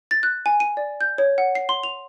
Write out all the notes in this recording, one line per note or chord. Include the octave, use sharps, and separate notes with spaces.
A6
F#6
G#5
D#7
D5
G6
C#5
F#5
C7
C6
F7